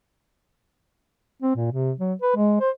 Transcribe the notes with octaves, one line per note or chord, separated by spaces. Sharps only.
C4
A#2
C3
F#3
B4
G#3
C5